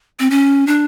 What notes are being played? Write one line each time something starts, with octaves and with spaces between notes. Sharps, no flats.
C4
C#4
D4